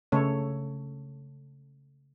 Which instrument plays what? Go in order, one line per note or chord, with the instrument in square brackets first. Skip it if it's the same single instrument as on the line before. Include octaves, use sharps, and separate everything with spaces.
[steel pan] C#3 A3 A4 C#5